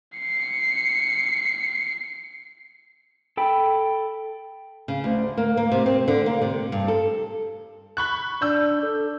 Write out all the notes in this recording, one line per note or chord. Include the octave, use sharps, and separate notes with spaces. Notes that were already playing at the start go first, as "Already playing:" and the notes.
C7 C#7
A4 G5 B5
C#3
D2
A#3
A#3
C3
C4
D3
A#3
C3
G2
A4
B5 C#6 F#6
D4 E6 G6
A4